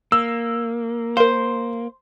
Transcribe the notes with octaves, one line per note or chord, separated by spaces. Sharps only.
A#3 E6
A#4 C5 F5